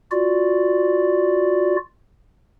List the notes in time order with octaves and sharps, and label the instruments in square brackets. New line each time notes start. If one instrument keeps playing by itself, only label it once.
[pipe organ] F4 F#4 D5